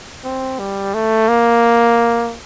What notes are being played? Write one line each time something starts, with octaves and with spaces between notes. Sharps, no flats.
C4
G3
A3
A#3